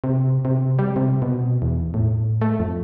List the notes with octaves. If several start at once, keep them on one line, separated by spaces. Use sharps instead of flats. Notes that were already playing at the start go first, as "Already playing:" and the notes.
C3
C3
G3
C3
B2
E2
A2
A3
F2